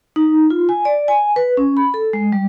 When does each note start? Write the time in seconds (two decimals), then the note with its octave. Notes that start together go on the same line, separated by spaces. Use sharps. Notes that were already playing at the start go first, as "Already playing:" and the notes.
0.16 D#4
0.50 F4
0.69 G#5
0.85 D5
1.08 G#5
1.36 B4
1.57 C#4
1.77 B5
1.94 A4
2.13 G#3
2.32 G3